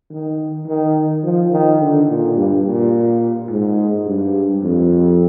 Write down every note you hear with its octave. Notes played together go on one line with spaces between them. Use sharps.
D#3
D#3
F3
D#3
D3
A#2
G2
A#2
G#2
G2
F2